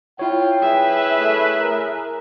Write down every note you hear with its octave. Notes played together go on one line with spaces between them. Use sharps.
E4 F4 C#5 G5
G#4 B4 E5
A3
A#4